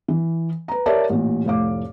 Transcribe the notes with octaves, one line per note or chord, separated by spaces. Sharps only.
E3
B4 A#5
G4 A#4 C#5 D5 E5 A5
A1 A#2
F1 A2 F5 D6